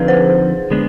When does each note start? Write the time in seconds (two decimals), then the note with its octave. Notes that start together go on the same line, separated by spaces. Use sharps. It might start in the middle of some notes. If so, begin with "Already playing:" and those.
Already playing: D3 F3 C4 D#4 G#4 B4
0.08 C5
0.71 D3 G#3 B3 D4